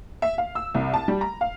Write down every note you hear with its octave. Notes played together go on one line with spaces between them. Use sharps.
E5
F5
E6
C2
A5
G3
A#5
F5